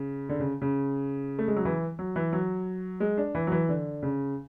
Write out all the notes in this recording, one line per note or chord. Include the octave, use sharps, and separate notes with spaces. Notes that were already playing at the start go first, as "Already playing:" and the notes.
Already playing: C#3
D3
C#3
C#3
A3
G#3
F#3
E3
F#3
E3
F#3
G#3
D4
E3
F#3
E3
D3
C#3